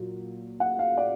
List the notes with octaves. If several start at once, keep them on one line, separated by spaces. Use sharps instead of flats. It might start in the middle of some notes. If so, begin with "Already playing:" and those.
Already playing: A#2 F#3
F#5
F5
D5